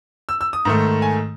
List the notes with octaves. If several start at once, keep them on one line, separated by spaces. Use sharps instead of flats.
E6
E6
D#6
G#2 D#3 A3
G#5